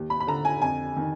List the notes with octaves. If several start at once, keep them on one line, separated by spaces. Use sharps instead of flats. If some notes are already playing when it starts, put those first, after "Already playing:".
Already playing: D#2
B5
B5
D3 A#5
G#5
F2 G#5
D#3